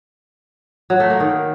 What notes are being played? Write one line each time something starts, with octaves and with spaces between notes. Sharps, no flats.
F#3
A3
A#3
D#3